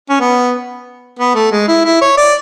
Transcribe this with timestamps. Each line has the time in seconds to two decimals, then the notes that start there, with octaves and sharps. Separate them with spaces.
0.10 C#4
0.20 B3
1.19 B3
1.35 A3
1.52 G#3
1.68 E4
1.85 E4
2.01 C#5
2.17 D5